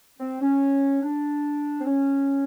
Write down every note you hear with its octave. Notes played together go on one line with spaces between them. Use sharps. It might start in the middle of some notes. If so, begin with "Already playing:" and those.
C4
C#4
D4
C4
C#4